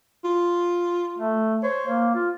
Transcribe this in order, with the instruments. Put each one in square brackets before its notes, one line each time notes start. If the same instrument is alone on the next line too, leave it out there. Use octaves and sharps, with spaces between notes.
[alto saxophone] F4
[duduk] A3
[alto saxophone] C5 [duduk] C#5
[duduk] A#3
F4